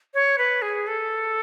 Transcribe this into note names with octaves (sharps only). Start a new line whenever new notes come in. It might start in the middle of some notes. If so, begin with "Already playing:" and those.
C#5
B4
G#4
A4